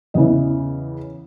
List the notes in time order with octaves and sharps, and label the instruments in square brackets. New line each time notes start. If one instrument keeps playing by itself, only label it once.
[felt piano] E2 C#3 E3 D#5